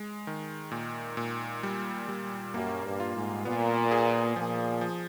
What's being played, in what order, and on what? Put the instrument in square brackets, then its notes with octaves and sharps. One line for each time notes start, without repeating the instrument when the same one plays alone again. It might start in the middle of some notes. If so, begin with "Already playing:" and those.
Already playing: [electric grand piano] G#3
D#3
A#2
A#2
G3
G3
[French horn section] F#2 [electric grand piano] A#3
[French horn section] G2
[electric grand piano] F4
[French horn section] G#2
[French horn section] A#2 [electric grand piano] B3
[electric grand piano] G#4
[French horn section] A#2 [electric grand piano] F3
[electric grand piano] F3